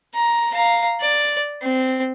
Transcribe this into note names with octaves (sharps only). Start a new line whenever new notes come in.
A#5
F5 A#5
D5
C4